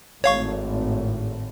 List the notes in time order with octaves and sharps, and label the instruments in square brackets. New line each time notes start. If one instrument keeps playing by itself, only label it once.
[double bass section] G#1 A2 [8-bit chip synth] C#5 F5 C#6